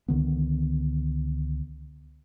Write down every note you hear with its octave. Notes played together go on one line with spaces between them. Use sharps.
C#2 D3 D#3 B3